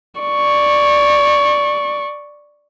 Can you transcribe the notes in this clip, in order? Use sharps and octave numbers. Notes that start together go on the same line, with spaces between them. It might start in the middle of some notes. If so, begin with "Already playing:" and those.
D5 C#6